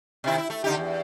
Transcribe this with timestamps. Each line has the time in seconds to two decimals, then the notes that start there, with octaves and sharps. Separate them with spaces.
0.24 C3 D#3 E4
0.38 E4
0.50 A3
0.64 D3 D#4 G4
0.77 E2